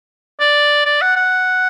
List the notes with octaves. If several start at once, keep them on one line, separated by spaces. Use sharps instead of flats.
D5
D5
F#5
F#5